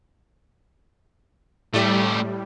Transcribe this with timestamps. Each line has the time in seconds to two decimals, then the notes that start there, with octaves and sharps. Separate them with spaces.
1.74 A2 G3 A3 G4